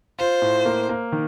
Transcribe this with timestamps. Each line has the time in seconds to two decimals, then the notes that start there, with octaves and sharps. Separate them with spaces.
0.19 F4 C5
0.42 A2
0.66 A#3
0.89 A#3
1.12 D#3